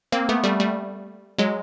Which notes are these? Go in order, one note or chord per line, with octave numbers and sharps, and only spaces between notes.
A#3 C4
A3 B3
G3 A3
G3 A3
F#3 G#3